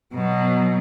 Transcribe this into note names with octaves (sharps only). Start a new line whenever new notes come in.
B2 F#3